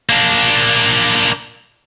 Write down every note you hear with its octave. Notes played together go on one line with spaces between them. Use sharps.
A#3 D4